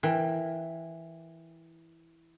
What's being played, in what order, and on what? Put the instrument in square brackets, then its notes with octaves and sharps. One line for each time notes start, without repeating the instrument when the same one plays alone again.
[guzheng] E3 [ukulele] A#4 G5